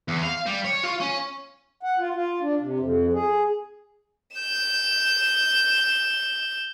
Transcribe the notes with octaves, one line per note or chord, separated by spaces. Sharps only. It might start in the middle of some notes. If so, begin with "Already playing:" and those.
E2
F5
G3
C#5
F4
C#4
F#5
F4
F4
D4
C3
F2
G#4
G6 E7